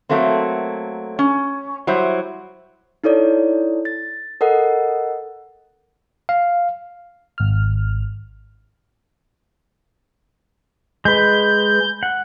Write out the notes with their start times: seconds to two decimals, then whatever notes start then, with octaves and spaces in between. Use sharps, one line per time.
0.09 F#3 A3 A#3 C4
1.19 C#4
1.87 F#3 G3 E4 C5
3.04 D#4 E4 A4 C#5 D5
3.85 A6
4.41 A4 A#4 D#5 F#5
6.29 F5
7.38 G#1 F6
11.05 G#3 B4 G6
12.03 F#5